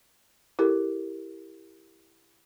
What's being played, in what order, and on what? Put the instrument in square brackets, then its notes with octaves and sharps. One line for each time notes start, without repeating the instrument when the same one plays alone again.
[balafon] E4 G4 A4 A#4